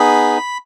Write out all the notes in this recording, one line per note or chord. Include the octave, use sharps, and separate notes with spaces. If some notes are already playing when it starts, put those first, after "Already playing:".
Already playing: B3 D#4 G#4 B5